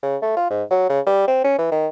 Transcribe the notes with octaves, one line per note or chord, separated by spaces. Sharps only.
C#3
A3
F4
G#2
F#3
C#3
G3
C4
C#4
E3
D#3